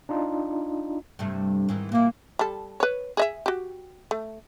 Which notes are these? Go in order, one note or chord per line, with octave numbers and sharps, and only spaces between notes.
D4 D#4 F4
G2 C3 A3
G#2 D#3 E3
A#2 A#3 E4
G3 A4
B4 C#5
G#4 D#5 E5
F#4 G4
A3